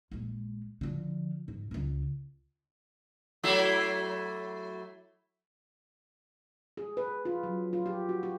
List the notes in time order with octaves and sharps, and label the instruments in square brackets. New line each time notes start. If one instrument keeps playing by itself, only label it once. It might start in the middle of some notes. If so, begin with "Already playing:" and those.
[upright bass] A#1 G#3
D3 F3
G#2
C#2 D4
[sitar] F#3 A3 E4
[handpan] G#4
B4
F4
F#3
F4
G4
F#4
G4